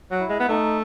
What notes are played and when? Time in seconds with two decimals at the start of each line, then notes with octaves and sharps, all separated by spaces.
0.11 F#3
0.20 E4
0.29 G#3
0.40 B3
0.49 A3 D#4